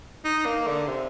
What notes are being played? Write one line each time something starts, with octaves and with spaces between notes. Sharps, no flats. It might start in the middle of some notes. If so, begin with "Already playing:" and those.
D#4
A#3
D3
C3